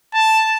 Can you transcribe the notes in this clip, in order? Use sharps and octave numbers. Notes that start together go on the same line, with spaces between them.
A5